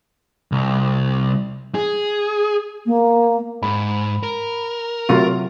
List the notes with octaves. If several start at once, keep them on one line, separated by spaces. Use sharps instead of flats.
C2
G#4
A#3
G#2 B5
A#4
C3 F#3 A3 F4